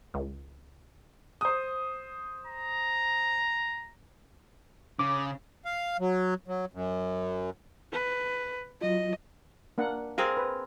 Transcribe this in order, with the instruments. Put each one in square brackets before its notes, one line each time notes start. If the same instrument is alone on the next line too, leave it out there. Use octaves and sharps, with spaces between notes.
[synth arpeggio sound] C#2
[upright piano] C5 D#6
[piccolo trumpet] A#5
[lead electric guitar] C#3 [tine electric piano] D6
[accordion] F5
F#3
F#3
F#2
[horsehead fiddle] B4
[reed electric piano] F#3 F4 [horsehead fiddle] D#5
[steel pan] A#3 D4 F#5
[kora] C4 G#4 A#4 [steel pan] F5
[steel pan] B4